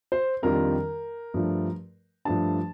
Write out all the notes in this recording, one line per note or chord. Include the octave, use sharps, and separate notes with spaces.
C5
F2 D#3 G3 D4 F4 A#4
G2 F3 A3 D4
G2 F3 A3 D4 A5